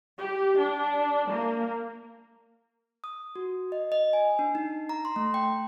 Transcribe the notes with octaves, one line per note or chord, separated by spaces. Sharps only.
G4
D4
A#3
D#6
F#4
D#5
D#5
G#5
D4
D#4
A#5
C6
A3
G5